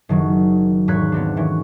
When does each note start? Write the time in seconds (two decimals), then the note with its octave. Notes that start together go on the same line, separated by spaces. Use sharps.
0.09 F#1 D#3 F#3
0.88 E1 G#2 C#5 B5 F#6 G#6
1.12 B3 C4 D4
1.36 D#3 E3 C#4